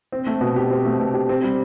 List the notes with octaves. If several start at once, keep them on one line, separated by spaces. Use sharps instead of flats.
C4
A3
B2
G4
C4
A3
B2
G4
C4
G3